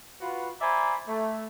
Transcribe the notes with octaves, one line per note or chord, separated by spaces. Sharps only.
F4 F#4 B4
C5 D5 E5 G#5 A#5 B5
A3